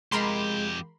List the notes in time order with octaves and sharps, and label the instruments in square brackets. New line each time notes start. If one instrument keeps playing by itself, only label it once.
[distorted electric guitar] F2 G4 [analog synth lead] G#3 [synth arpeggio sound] A#4 B5 C6